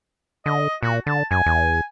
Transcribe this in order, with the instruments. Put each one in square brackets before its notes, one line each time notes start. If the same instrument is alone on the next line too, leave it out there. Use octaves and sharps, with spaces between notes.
[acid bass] D3 [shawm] D#5
[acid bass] A#2 [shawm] F#4
[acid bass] D3 [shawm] A5
[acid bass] F#2 [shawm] G#5
[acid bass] E2